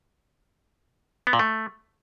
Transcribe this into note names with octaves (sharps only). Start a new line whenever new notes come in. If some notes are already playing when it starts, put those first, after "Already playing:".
B3
A#2
A3